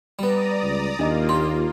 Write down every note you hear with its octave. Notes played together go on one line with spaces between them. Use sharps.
G3 B3 D5 A#5 D#6
C#2
D#2 A#3 D4 F4 D#5 A#5
G4 C6